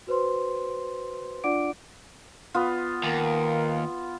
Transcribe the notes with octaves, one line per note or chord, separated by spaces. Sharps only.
F#4 B4 C5 C6
D4 F4 D5 F#5 D6 D7
B3 F4
D#2 A#4